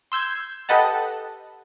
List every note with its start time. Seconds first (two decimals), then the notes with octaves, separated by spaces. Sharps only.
0.12 C6 E6 G6 G#6
0.69 G4 A4 B4 D#5 F#5 A5